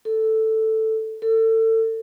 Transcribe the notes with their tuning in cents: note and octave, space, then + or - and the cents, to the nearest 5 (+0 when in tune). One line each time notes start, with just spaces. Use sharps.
A4 +5
A4 +30